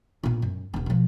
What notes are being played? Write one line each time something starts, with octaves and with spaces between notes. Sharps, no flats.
A#2 B3
F#2
D#1 B3
B2 F3